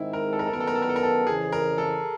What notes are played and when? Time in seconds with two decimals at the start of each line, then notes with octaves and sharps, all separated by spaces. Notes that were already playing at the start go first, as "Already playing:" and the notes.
Already playing: G#2 D#3 G#3 C4 D#4 E4
0.13 A#4
0.33 A4
0.39 A#4
0.47 A4
0.52 F#2 D#3 G3 B3 A#4
0.60 A4
0.67 A#4
0.75 A4
0.82 A#4
0.89 A4
0.96 A#4
1.03 A4
1.27 F2 C#3 E3 G#4
1.52 A#4
1.78 A4